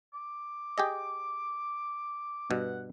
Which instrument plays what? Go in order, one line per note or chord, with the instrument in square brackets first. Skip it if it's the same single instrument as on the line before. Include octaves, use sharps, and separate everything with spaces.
[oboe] D6
[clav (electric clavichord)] G4 G#4 D#5
[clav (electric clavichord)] G2 B2 [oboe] F#5